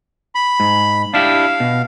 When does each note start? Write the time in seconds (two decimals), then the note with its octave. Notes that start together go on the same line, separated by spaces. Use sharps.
0.35 B5
0.60 G#2
1.14 D4 E4 G4 F5
1.60 B2